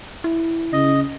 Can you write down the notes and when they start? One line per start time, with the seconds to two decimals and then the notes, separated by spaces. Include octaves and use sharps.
0.24 E4
0.73 C#3 D#5